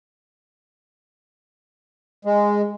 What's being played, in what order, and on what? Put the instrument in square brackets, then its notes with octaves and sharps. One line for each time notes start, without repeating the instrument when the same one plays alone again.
[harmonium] G#3